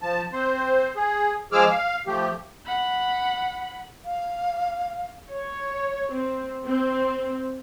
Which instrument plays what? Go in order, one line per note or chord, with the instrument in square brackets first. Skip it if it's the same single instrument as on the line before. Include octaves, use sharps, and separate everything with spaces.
[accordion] F3 A5
C4 C5
G#4
F3 G#3 G#4 D6 E6 F6
F5
F3 A3 G4
[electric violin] F#5 B5
[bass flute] F5
[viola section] C#5
C4
C4